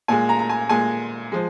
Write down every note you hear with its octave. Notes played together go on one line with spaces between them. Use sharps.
A#2 G#3 G#5
A#5
A#5
G#5
A#2 G#3 G#5
F3 G#3